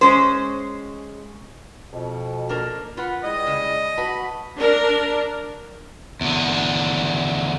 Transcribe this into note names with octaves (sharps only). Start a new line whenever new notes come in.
G#3 C#4 C5
F2 B2
A#3 D4 A#4
F4 B4 F#5
G3 G#3 E4 D#5
C#3
F#4 B4 A5 B5
D4 A#4
E2 D3